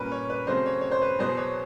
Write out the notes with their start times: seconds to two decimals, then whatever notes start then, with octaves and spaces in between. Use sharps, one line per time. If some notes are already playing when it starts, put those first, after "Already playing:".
Already playing: A#2 G3 A#3 C#4 A#4 B4
0.12 C#5
0.30 B4
0.47 C#3 F#3 A3 C4 C5
0.66 C#5
0.81 C#5
0.91 C5
1.02 B4
1.19 E2 B2 F#3 B3 C5
1.37 C#5